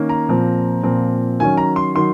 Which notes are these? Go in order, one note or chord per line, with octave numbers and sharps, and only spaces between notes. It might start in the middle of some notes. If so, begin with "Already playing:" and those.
Already playing: D#3 A#3 C#4
A#5
A#2 F3 C4
A#2 F3 C4
D#3 F#3 C#4 G#5
A#5
C6
D#3 F#3 C6